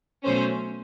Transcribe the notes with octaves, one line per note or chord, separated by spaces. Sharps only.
B2 F#3 A3 C#4 C5